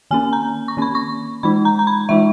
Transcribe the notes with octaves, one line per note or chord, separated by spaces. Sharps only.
D#3 A#3 C#4 G#5
A#5
C#6
D#3 A#3 C#4 B5
C#6
E3 G#3 D#4 B5
A#5
A#5
B5
E3 G#3 D#4 E5